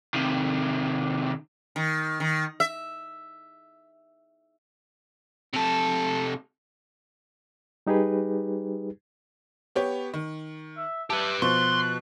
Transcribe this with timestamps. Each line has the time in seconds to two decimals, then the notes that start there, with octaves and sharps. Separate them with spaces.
0.14 C3 D#3
1.76 D#3
2.20 D#3
2.60 E5
5.53 C3 A4
7.87 G3 D#4 G4 G#4 B4
9.75 B3 G4 C#5
10.14 D#3
10.77 E5
11.10 G4 B4 E5 A5
11.42 B2 F3 C6 C#6 F#6